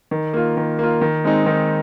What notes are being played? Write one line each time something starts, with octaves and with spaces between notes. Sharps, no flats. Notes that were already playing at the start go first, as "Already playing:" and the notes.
D#3
A#3 F4
D#3
A#3 F4
D#3
G#3 C4 D#4
D#3